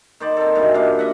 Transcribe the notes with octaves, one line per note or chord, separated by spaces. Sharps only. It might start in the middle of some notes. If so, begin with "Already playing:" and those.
D#3 C5 D5
C4 A4
G2 B2 E3
G2 A#3 F4 F5
D#5 E5 F#5